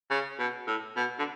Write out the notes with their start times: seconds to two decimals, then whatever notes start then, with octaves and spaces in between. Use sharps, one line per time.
0.11 C#3
0.39 B2
0.67 A2
0.96 B2
1.19 D3